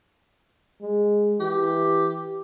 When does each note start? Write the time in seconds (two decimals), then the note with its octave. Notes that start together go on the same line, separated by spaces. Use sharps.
0.82 G#3
1.41 E3 G4